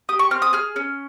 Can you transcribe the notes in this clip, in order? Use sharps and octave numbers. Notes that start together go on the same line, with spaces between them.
G4 D#6
C#6
C4 F6
D#6
G#4 F6
C#4